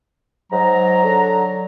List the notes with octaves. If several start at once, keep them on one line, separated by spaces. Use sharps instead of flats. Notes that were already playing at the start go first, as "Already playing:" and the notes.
G#2 F#3 A#5
D3